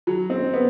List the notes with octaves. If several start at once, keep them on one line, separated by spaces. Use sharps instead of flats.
F#3
C4
B3